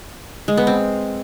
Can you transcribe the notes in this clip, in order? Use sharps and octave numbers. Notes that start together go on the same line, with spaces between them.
G#3
B3
C4